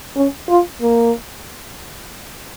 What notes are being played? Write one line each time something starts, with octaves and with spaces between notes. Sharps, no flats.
C#4
F4
A#3